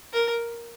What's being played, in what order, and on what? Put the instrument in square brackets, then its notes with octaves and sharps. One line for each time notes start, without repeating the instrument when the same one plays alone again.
[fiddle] A#4